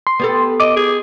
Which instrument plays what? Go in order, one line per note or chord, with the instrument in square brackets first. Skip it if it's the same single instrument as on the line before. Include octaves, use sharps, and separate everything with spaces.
[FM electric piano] C6
[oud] B3 G4 A4
[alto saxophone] D#5 [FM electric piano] D6
[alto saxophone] G#4